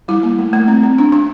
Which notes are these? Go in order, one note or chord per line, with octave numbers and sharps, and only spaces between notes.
G3 E4
A#3
A3
A3
C4
C4
D4
D4